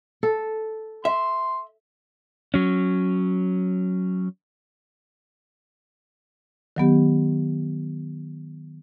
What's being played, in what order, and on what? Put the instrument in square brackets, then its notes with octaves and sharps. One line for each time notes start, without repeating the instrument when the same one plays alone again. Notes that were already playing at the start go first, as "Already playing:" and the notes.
[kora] A4
[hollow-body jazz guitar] E5 [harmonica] C6
[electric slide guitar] F#3 C#4
[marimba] D#3 F#3 B3 G4